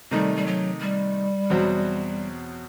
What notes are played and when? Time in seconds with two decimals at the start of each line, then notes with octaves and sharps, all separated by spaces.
0.11 C3 D#3 G3 A3 D#4
0.36 G3
0.46 F#3
0.81 G3
1.50 E2 B2 F#3 C4 F#4